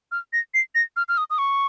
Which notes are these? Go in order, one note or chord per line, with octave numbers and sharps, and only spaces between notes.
F6
A#6
C7
A#6
F6
F6
D#6
D#6
C#6